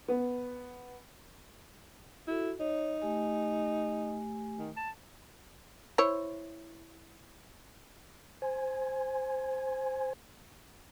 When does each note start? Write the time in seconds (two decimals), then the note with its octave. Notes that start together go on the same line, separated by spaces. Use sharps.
0.08 B3
2.27 E4 F#4 A4
2.60 D#4 C#5
3.02 A3 G4 G#5
4.58 D#3
4.77 A5
5.98 E4 C5 C#5
8.42 C5 G#5